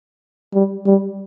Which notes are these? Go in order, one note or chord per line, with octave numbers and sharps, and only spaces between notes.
G3
G3